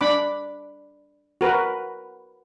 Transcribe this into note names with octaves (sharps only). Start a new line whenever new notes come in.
D4 B5 D6
F#4 A#4 B4